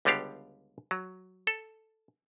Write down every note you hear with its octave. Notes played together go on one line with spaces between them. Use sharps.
C#2 D3 G3 B3 G4 F5
F#3
A4